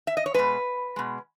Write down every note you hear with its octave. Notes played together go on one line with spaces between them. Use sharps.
E5
D#5
C#5
B2 G#3 B4
B2 G#3